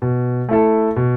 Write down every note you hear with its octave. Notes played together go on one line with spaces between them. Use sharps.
B2
A3 E4 A4
B2